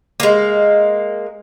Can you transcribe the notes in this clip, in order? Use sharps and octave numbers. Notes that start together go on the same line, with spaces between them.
G#3 A#3